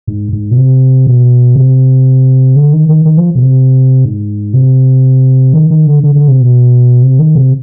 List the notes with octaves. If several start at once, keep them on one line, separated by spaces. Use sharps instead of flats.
G#2
G#2
B2
C3
B2
C3
D3
D#3
D#3
D#3
F3
B2
C3
G#2
C3
D#3
D#3
D3
D3
D3
C3
B2
C3
D#3
C3